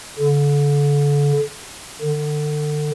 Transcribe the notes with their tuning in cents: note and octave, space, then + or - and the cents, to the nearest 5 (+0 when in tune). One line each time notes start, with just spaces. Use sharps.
D3 -35
D3 +30